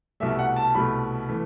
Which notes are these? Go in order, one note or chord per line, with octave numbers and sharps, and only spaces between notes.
C2 B2 A3 E5
F#5
A5
C2 B2 A3 B5
E3 A3